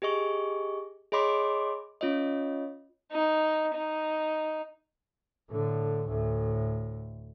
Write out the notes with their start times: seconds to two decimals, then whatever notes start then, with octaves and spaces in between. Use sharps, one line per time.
0.02 G4 G#4 D#5 C#6
1.12 G#4 C#5 D#5 B5 C6 D6
2.01 C#4 F4 C#5 D#5
3.12 D#4
3.74 D#4
5.50 A2 D3
6.08 D2 A2